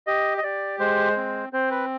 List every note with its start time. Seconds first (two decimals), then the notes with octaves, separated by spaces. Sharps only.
0.07 G4 D#5
0.38 D#5
0.43 G4 D5
0.79 G#3 C5
1.17 C4
1.53 C4 C5
1.71 B4